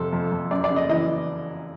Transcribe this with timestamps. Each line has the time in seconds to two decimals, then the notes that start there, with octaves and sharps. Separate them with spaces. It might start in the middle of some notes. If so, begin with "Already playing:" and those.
Already playing: F2 C3 A4
0.13 F2
0.32 F2
0.51 F#2 D5
0.64 D5
0.70 C#3
0.76 D#5
0.89 E3 D#5